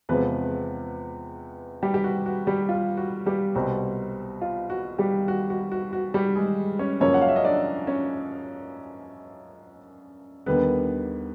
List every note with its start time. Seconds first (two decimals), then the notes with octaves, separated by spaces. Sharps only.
0.09 E2 C3 F3 G#3 B3 C4 B4
1.83 G3 G4
1.94 G4
2.04 F#4
2.26 F#4
2.47 G3 G4
2.69 F4
2.97 F#4
3.26 G3 G4
3.55 C2 B2 G3 C4 F#4
4.41 F4
4.70 F#4
4.99 G3 G4
5.28 F#4
5.50 F#4
5.71 F#4
5.93 F#4
6.14 G3 G4
6.35 G#3 G#4
6.79 C#4 C#5
7.00 F#2 C#3 F3 A#3 C#4 C#5
7.14 F#5
7.21 F5
7.28 E5
7.36 D#5
7.44 D4 D5
7.87 C#4 C#5
10.46 D#2 D3 G3 B3 B4